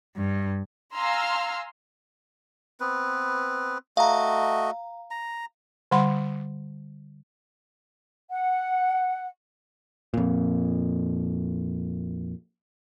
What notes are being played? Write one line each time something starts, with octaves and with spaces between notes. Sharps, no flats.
G2
F5 G#5 A#5 C6 E6 F6
B3 C4 B4
A3 F#4 D#5 F5 A#5
A#5
D3 G3 F#5 B5 C6
F#5
F2 A#2